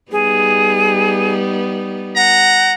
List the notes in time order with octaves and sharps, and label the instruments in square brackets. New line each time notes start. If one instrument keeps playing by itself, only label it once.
[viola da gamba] G3 B3 D#4 [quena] G#4
[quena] F#5 [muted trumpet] A#5